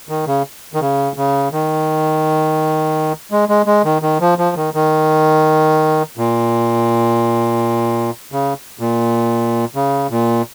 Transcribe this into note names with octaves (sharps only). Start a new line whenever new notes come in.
D#3
C#3
D#3
C#3
C#3
D#3
G#3
G#3
G#3
D#3
D#3
F3
F3
D#3
D#3
A#2
C#3
A#2
C#3
A#2